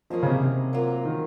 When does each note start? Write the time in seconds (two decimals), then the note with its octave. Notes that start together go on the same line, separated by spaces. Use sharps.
0.10 D#3 F3 A#3 C#4 G#4
0.23 C#3
0.27 C3
0.43 C3
0.73 F#3 A#3 F4 A#4
1.05 D#3